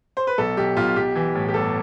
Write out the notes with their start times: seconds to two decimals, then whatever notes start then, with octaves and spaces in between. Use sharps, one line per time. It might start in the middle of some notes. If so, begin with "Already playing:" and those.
0.17 C5
0.27 B4
0.38 B1 A4
0.57 B1 G4
0.77 B1 F4
0.96 B1 G4
1.16 E3
1.35 A2
1.49 G4
1.54 G1 A4